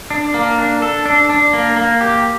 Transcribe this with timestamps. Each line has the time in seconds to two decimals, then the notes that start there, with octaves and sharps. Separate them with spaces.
0.10 D4
0.34 A#3
0.58 D4
0.82 A4
1.06 D4
1.30 D4
1.53 A#3
1.77 A#3
2.01 G4